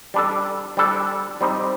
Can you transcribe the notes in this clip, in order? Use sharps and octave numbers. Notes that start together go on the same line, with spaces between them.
G3 D4 A4
G3 D4 A4
G3 C4 D#4